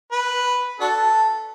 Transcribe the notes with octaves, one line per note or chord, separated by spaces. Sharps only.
B4
D4 F#4 A4